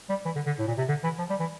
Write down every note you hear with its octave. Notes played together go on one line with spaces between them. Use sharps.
G3
E3
D3
D3
A2
A#2
C3
D3
E3
F3
G3
E3